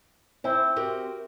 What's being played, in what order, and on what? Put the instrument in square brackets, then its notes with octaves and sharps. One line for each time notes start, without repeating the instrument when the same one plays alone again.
[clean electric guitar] C4 [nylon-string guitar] E4 C5
[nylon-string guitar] F#4 G4 A#4